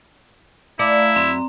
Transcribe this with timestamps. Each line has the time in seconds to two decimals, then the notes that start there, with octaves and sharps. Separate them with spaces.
0.79 A3 E4 D5 F5 A#5
1.16 F#2 C4 A#5